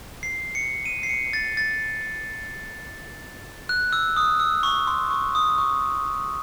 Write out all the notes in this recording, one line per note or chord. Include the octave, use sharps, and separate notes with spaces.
C7
C#7
D#7
C7
C#7
A6
A6
F#6
E6
D#6
E6
C#6
C6
C#6
D#6
C#6